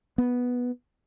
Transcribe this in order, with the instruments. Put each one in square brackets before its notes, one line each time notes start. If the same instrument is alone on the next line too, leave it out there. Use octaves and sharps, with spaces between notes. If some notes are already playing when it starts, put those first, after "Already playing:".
[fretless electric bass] B3